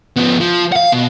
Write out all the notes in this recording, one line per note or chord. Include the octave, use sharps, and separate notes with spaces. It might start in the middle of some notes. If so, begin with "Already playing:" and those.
F3 B3
F3
F5 F#5
B2